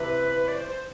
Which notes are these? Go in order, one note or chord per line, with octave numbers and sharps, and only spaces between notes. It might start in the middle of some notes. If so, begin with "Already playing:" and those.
Already playing: C3 E3 B4
D5
C5
C5